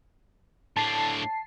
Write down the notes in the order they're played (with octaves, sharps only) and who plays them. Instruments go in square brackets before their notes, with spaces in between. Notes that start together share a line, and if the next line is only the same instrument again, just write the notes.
[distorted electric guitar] A2 D4 [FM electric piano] A5 C7